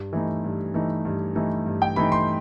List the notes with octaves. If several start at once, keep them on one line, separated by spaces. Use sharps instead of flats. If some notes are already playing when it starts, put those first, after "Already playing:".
Already playing: G2
E3 A3 D#4
G2
E3 A3 D#4
G2
E3 A3 D#4
G2
G5
E3 A3 D#4 B5
C6